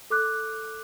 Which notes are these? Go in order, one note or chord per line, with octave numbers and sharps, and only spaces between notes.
A4 D6 F#6